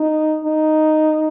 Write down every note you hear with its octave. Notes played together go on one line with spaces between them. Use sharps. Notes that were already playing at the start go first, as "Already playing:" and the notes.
Already playing: D#4
D#4